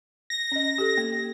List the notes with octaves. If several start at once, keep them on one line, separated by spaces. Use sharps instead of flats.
A#6
C#4 D#5
G4 A4
A#3